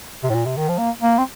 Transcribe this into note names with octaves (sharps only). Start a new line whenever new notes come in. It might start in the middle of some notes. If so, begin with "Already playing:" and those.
C3
A2
A#2
C3
D#3
F3
A#3
A#3
C4